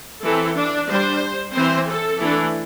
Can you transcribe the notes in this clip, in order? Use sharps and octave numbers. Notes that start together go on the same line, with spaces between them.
E3 C4 A4
D4
G3 D4 C5
E3 C4 C5
A4
E3 A3 D4